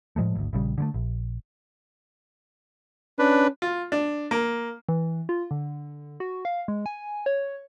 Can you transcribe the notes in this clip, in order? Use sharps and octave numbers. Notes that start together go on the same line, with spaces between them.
A2 F3 G#3 A3
G#1 D2
A#1 C#3 G3
D3 G#3 A3
A#1
C#4 D4 B4
F4
D4
A#3
E3
F4
D3
F#4
F5
G#3
G#5
C#5